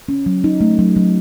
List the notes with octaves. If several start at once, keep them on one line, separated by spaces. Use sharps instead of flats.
C#4
F#3
D#4
A3
F#3
F#3